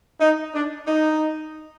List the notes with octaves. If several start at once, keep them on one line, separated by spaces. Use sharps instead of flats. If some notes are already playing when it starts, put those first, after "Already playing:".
D#4
D4
D#4